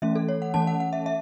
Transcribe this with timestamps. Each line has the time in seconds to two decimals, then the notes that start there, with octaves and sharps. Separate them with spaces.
0.02 E3 A3 C#4 E5
0.16 A4
0.29 C#5
0.42 F#5
0.54 E3 A3 C#4 A5
0.67 F#5
0.80 F#5
0.93 E5
1.06 E5